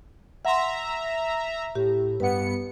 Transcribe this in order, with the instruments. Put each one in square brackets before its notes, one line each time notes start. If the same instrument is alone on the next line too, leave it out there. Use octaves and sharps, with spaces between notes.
[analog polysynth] E5 A#5 [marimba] F#5 C6
[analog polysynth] A2 [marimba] G4
[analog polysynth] G2 B3 C#7 [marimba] B4 F#5